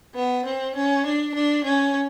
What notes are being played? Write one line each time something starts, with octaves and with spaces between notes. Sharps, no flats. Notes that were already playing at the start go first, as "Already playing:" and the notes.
B3
C4
C#4
D4
D4
C#4